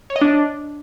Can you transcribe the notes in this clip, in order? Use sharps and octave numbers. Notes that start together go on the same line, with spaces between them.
C#5
D#5
D4